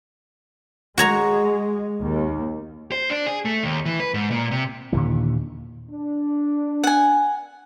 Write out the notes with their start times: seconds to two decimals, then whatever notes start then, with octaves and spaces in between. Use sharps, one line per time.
0.98 G#3 F#4 C#5 A#5
2.01 D#2
2.92 C5
3.10 D4
3.27 G#4
3.45 A3
3.63 D#2
3.86 E3
4.00 B4
4.14 G#2
4.31 A#2
4.51 C3
4.93 D#2 A#2 D3 E3
5.89 D4
6.84 F#5 G#5